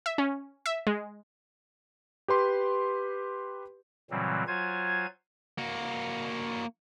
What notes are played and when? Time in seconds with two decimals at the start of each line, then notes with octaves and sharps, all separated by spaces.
0.06 E5
0.18 C#4
0.66 E5
0.87 G#3
2.28 G4 B4 C6 D6
4.11 A#2 C#3 E3 F#3 G3 C4
4.47 F#3 F4 C5 G#5 G#6
5.58 A#3 F#4